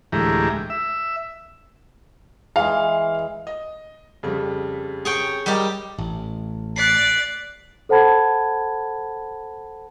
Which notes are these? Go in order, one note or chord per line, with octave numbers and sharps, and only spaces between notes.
D2 A2 E3 G#3 G4 A#5
E5
E3 G#3 F5
D#5
F2 C#3 G3
G#4 C#5 G5
G3 G4 A#4 D#5 G5
A1
D5 F#6 B6 C7
A4 C5 F#5 A5 B5 G#6